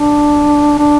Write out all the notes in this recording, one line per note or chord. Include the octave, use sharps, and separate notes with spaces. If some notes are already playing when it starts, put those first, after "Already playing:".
Already playing: D4
D4